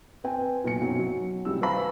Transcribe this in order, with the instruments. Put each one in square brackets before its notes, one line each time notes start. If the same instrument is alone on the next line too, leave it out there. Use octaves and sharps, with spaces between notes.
[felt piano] C4 B4 G5 G#5
B1 A#2 G#5 C#7
F#2 B2 F#3 C4 D#4
F#3
D#1 A1 C3 G3 E6
B4 C5 F5 G#5 A#5 B5